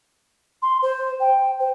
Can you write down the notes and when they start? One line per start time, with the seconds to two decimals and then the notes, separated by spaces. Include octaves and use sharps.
0.62 C6
0.82 C5
1.20 G5
1.59 C5